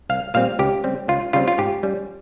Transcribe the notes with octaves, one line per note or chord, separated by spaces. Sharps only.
C2 F5
A#2 G3 C4 F5
C#2 G4
C#3 G3 C4
C#2 F4
C#3 G3 C4 F4
F4
G#2 G4
G3 C#4